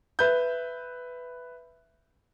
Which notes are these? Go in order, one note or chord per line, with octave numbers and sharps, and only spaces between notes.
B4 E5 G6